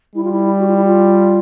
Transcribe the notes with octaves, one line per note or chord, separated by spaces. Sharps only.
G3 E4
F4
E4
F#4
F4
E4
F4